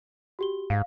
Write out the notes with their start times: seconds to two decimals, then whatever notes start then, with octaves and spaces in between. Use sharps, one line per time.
0.39 F#4 G4 G7
0.70 G#2 F5